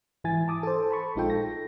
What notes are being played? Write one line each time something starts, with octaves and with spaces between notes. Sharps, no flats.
G#2 E3 E4 G#5 A6
A5 D6 D#6
A4 C5
A5 B5 C#6
A#1 G#3 D#4 F4 A4 G5
A#6